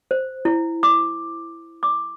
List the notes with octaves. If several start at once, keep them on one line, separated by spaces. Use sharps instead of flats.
C5
E4
D6
D6